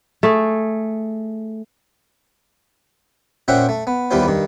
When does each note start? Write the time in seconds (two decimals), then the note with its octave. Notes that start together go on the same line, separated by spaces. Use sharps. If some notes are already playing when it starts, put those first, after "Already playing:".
0.23 A3 G#4
3.48 A#2 C#4 C5 E5 F#5 G5
3.69 A3
3.87 B3
4.11 D#2 E3 G3 B3 F4 C5
4.28 G2 D#3